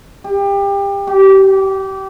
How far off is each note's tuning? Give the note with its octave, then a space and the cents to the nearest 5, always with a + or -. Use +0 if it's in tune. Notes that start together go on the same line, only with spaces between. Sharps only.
G4 +25
G4 -25